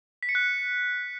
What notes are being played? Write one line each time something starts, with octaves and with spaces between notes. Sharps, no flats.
B6
C#7
F#6